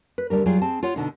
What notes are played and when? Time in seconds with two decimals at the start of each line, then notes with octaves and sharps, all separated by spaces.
0.18 B4
0.30 D2 D3 G3 A#4
0.46 F#3 G3 F4 G4 G#4
0.61 C4 G#4 A5
0.83 F4 C#5 F#5
0.96 B2 D3 D#4